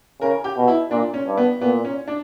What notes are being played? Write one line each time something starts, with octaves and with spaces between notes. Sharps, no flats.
C#3 A#4
G4
B2
E4
A#2 D4
C#4
G2
B3
A#2 B3
C#4
D4